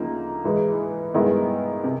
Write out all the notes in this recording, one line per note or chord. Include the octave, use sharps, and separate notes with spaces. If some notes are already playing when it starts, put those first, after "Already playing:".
Already playing: D2 C#3 F3 A#3 D#4
G#2 E3 G#3
G2 D#3 G#3 B3 E4
C3